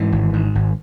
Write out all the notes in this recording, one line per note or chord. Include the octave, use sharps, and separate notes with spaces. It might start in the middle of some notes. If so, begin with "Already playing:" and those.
Already playing: G#2 E3
G#1
G#2
G#1